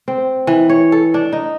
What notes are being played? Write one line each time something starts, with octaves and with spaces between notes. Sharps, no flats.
C4
E3
C#5
A4
D4
D#4